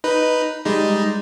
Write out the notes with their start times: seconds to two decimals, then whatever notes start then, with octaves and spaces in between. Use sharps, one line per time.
0.04 D#4 B4
0.65 G3 G#3 D#4